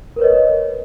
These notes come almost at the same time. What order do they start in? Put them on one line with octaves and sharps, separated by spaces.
A#4 B4 C#5 D#5